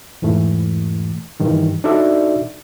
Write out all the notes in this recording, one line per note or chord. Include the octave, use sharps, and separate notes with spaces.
E2 G#2 E3 A3
G2 D#3 E3
D4 D#4 F#4 A4 D5 E5